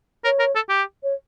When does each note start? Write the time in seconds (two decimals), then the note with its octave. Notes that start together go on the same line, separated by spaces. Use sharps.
0.25 A#4 C#5
0.39 A#4
0.55 A4
0.69 G4
1.03 C#5